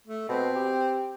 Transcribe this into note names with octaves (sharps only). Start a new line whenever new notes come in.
A3
B2 C4
G4